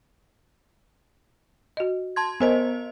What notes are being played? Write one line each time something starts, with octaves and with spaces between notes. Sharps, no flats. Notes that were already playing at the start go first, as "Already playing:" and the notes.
F#4 D#5
A5 C6 G#6
B3 A#4 C5 D#5 G#5